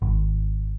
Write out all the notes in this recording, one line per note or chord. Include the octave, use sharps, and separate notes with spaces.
G#1